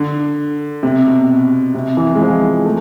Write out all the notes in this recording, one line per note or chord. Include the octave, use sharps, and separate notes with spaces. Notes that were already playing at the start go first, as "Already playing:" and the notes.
Already playing: D3
C3
B2
C3
E3
G#3
F3
A3